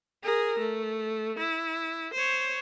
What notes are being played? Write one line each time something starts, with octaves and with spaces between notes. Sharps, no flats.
G#4 A#4
A3
E4
C5 C#5